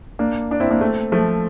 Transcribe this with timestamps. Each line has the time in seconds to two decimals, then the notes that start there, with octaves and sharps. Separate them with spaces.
0.19 A#3 D4
0.51 D4
0.60 C4 E4
0.71 A#3 D4
0.81 A3 C4
1.12 F3 A3